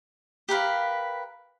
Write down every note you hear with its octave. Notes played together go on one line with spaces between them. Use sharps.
G4 A#4 B4 F5